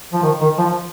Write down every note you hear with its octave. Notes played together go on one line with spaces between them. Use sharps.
F3
D#3
D#3
F3